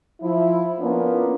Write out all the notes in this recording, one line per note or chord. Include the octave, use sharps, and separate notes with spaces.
F3 E4
A#3 B3 C#4 D4 F4